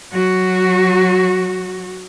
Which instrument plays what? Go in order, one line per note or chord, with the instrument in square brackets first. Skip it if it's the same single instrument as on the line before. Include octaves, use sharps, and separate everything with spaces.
[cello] F#3 F#4